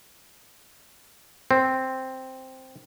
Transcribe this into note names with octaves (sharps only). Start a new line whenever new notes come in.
C4